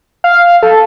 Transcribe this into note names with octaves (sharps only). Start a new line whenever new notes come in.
F5
A4